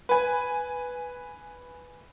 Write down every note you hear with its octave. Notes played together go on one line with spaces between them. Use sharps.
B4 G#5